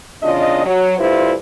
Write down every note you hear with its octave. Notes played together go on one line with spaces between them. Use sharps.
E2 C#3 D4 F4 D#5
F#3
D2 G2 E4 F4 C5